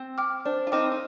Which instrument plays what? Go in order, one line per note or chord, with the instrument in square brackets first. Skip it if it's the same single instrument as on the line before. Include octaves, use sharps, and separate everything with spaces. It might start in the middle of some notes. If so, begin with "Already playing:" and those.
Already playing: [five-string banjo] C4
[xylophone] G5 D6 F6
[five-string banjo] D4 [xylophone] C5
[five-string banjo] F4
[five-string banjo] C4 D#4 [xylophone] G5 D6 F6
[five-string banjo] D#4